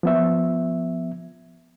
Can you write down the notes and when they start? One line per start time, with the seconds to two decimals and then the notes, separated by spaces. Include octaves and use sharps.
0.03 F3 B3 E5